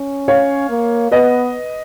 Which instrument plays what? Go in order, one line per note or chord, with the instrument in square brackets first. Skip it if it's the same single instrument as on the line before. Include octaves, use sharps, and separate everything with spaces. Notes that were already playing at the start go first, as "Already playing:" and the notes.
Already playing: [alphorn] C#4
[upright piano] C#5 F5
[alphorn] A#3
[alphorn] B3 [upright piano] B4 D#5